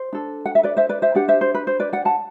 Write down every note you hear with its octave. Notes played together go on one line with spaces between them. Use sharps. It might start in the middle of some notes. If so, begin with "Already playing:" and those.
Already playing: C5
D4 A4
F#5
E5
B4 D5
C5 E5
B4 D5
C5 E5
D4 G4 B4 D5 F#5
C5 E5
C5
B4
C5
B4 D5
D5 F#5
F#5 A5